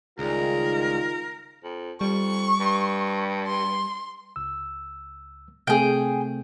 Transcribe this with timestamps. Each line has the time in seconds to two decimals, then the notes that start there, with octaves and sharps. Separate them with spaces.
0.19 C#2 D#3 G3 D#4 F4 G#4 A#4
1.64 F2
2.01 F2 G3 C#6
2.60 G2
3.47 C6
4.36 C#2 E6
5.67 C3 A3 C4 G#4 G5